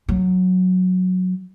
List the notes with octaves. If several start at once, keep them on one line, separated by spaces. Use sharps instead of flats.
F#3